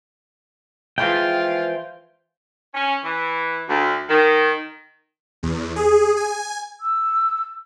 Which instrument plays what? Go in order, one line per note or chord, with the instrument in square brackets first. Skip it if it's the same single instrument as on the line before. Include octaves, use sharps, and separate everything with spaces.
[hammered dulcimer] E3 F3 G#3 [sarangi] F4 [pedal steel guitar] G5
[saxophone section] C#4
E3
D2
D#3
[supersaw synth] E2
G#4
G#5
[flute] E6